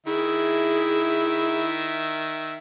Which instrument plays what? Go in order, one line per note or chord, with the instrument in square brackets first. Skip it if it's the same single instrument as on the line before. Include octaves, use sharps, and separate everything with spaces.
[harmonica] D#3 E5 [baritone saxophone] E4 [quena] G#4